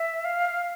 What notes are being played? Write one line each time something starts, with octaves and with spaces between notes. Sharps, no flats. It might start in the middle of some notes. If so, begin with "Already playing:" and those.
Already playing: E5
F5